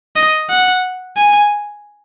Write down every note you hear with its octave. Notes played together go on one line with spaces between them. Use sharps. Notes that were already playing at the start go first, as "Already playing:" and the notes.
D#5
F#5
G#5